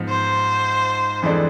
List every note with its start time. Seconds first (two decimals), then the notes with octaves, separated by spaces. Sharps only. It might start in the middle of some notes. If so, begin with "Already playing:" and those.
Already playing: G#2 F3 B3
0.09 C5
1.23 F2 E3 G#3 D4 A4